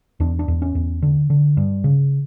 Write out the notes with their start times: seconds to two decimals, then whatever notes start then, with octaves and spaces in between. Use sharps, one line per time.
0.20 E2 D4
0.39 D4
0.48 E2
0.62 C#4
0.75 E2
1.02 D3
1.30 D3
1.57 G2
1.84 C#3